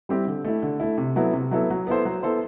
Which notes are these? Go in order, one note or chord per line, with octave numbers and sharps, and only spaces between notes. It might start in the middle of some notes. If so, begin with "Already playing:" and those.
G3 C4 E4 G4
D3
A3 E4
D3
A3 E4
C3
F#3 B3 E4 A4
C3
F#3 B3 E4 A4
F#3
B3 E4 A4 C5
F#3
B3 E4 A4 C5